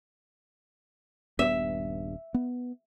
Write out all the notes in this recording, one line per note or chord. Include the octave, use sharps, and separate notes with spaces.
D#1 G2 B3 E5
B3